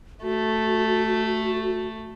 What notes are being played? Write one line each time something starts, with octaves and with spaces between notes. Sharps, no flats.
A3 F#4